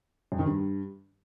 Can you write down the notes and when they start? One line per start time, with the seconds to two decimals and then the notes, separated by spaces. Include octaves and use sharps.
0.32 F2
0.39 D#3
0.46 G2